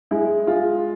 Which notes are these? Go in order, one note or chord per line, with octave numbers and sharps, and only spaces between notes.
G#3 E4
G#3 F4